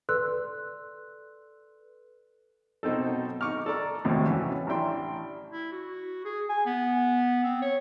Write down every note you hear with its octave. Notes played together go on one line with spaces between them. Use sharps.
A4 B4 D5 C6 E6 F#6
B2 F#3 C4 D#4 A4
D#4 C#6 D6 F6
A4 D5 A#5
G#1 D#2 A2 C3
E3 F#3 C#4
A1 D4 E4 G5 C6
E4
F#4
G#4
G#5
B3
C4
C#5